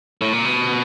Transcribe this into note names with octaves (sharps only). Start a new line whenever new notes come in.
A2
A#2
B2